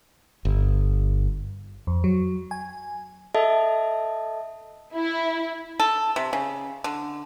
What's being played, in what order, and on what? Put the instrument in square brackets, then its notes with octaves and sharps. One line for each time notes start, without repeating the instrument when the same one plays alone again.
[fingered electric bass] G1
[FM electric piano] F2
F#3
G#5
[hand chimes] A4 D#5 E5 A5
[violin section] E4
[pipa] A4
C3
C#3
D3